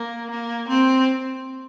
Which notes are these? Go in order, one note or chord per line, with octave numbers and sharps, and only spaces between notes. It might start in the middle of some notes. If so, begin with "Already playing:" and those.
Already playing: A#3
A#3
C4